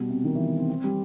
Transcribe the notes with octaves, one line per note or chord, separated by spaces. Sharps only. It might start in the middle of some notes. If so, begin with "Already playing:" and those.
Already playing: B2 G3
C3
D#3
E3
C4
C4
G3